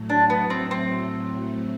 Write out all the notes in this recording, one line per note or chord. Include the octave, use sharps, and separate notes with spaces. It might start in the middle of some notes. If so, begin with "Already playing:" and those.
Already playing: A2 F#3 A3
D4
B3
C4
C4